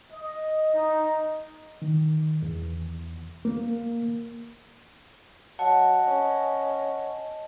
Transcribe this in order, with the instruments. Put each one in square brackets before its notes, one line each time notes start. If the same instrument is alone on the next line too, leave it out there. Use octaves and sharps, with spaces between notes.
[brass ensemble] D#5
D#4
[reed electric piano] D#3
E2
A#3
[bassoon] F#3 [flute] D#5 [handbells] F#5 [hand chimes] A5
[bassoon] C#4